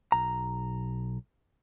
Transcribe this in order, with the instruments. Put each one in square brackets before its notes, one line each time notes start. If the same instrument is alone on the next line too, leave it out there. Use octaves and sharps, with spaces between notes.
[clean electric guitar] B1 A#5